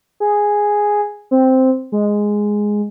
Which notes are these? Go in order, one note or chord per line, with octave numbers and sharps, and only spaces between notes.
G#4
C4
G#3